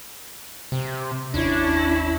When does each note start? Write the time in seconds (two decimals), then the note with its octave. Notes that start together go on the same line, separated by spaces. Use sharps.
0.72 C3
1.34 G1 D#2 C#4 D4 E4